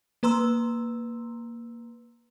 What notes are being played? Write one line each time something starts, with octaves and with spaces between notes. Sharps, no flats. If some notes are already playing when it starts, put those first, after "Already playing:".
A#3 B4 A#5 C6 E6